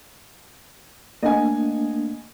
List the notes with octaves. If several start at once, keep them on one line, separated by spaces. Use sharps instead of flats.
A3 A#3 D4 D#5 F#5 G#5